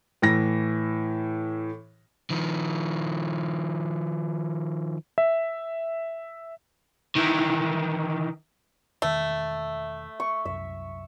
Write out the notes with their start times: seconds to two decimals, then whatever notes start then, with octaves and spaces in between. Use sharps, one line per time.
0.22 A2 E3 A#6
2.30 D#3 F3
5.18 E5
7.15 D#3 E3
9.02 E1 D#3 A3 E5
10.20 C#6
10.45 C2 F#2 E5